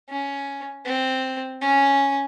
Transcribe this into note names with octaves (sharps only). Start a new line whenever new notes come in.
C#4
C4
C#4